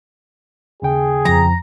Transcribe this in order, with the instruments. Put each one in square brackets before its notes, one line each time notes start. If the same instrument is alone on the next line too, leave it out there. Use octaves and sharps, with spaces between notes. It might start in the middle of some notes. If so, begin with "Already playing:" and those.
[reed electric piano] D#2 C#3 G5 [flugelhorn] G#4
[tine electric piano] F2 F3 [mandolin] A#5